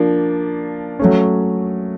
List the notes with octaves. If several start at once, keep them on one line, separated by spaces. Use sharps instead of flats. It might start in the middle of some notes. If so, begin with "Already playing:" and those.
Already playing: F3 A#3 D4
F#3 A3 C#4